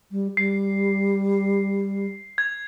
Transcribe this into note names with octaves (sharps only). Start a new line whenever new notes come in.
G3
G3 C7
G#6